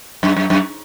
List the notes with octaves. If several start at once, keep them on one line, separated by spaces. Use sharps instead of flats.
F#2
F#2
F#2